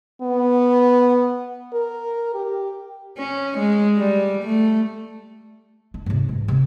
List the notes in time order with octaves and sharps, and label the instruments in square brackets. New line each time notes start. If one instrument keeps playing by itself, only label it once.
[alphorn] B3
A#4
G4
[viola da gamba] C#4
G#3
G3
A3
[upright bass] D4
G#2 C3
E3
C3 C4